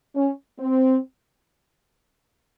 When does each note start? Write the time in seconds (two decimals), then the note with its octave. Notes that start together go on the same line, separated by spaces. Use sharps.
0.15 C#4
0.58 C4